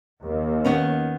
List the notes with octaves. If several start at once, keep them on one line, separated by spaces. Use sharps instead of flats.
D#2
D#3 B3 C#4